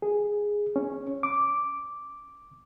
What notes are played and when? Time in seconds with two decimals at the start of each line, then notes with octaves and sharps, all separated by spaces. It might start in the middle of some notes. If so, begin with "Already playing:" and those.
0.02 G#4
0.76 C#4
1.23 D6